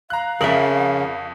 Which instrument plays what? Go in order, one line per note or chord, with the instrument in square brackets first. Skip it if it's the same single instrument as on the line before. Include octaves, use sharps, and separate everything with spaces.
[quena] F5 [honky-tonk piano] A#5 F#6
[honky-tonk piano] F2 F#7 [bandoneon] C#3 [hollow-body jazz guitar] A#4 E5